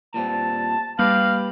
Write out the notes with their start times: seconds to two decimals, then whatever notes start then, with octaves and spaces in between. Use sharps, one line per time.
0.14 A#2 G3 C4 A5
0.99 G3 A#3 G4 B4 F5 F#7